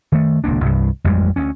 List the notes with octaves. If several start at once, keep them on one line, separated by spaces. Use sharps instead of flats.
D#3 A3
D#1 C#2 A#3 D4
C2 G2
A1 F2 G3 G#3
D2 C#4